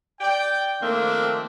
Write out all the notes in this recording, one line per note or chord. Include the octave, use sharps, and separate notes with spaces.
D5 G5
D#3 F3 A3 A#3 C4 D4